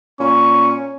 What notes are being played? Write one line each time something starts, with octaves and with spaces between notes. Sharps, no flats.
A#2 C#4 C#6